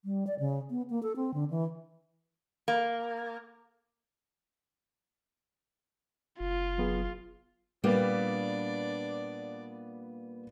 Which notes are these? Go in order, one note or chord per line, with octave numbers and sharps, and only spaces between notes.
G3
D5
C#3
B3
A#3
A4
C4
D3
E3
A#3
F#1 F4
F#3 B3 G#4
A#2 G3 A#3 B3 D4 B4 D5